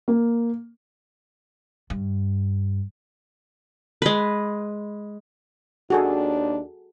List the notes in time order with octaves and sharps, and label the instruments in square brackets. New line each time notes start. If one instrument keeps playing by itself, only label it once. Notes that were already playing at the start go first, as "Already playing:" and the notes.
[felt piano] A#3
[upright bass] G2
[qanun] G#3 B4
[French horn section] D#2 D4 [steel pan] F#4 G#4 A4